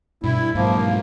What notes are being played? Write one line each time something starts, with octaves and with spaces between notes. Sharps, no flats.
G2 B2 E4
G#2 F3 F#3 A#3 E4